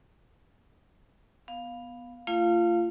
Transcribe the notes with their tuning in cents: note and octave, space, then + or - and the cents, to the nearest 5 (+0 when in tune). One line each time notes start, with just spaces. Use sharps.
B3 +0 F5 +10
A3 +30 F4 -25 F5 +0